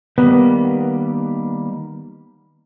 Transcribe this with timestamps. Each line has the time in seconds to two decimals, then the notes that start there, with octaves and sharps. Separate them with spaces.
0.18 D#3 G3 A#3 B3